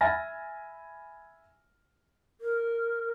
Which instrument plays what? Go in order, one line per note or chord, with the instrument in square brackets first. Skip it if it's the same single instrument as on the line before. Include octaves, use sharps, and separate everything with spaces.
[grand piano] E5 G#5 B5 F6 A6 A#6
[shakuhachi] A#4